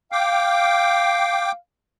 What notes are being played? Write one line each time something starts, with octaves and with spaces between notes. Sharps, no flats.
F5 G5 D6